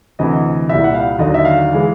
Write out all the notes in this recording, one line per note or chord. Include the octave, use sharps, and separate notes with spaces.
D2 C3 E3 D#5
C2 A#2 G3 E5
F#5
F5
D#2 D3 F#3 D#5
E5
F5
E3 G#3